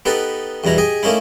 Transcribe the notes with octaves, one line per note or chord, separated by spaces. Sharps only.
B3 D#4 G4 A4 B4
E2 G2 B2 E4 A#5
G4 G#4 D#5 G#5
A3 A#3 C#4 D#4 E4